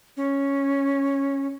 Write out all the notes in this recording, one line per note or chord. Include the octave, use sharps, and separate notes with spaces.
C#4